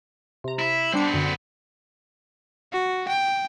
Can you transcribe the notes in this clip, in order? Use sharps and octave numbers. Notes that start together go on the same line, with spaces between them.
C3 A#5
E4
G3 B3 D4 C5 C#7
F#2 D3
F#4
G5